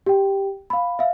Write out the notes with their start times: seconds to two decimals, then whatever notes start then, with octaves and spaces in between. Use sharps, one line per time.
0.06 G4 G5
0.70 F5 B5
0.99 E5 F5